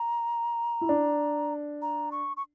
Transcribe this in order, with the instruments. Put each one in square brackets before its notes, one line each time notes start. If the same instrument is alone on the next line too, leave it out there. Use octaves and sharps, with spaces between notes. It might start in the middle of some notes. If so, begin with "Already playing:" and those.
Already playing: [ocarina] A#5
[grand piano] E4
D4
[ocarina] A#5
C#6
C#6